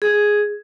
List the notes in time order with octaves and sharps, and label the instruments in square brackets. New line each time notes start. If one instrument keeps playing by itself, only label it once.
[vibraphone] G#4